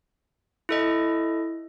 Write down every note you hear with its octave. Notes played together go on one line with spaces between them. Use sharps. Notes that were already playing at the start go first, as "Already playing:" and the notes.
E4 A4 D#5